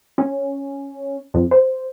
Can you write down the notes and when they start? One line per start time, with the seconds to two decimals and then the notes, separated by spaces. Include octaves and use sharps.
0.18 C#4
1.34 F2
1.51 C5